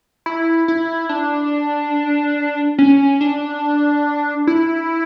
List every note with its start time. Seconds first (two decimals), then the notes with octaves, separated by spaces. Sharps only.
0.26 E4
0.68 E4
1.09 D4
2.78 C#4
3.21 D4
4.47 E4